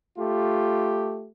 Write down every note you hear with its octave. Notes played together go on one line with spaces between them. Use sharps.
A3 F4 G4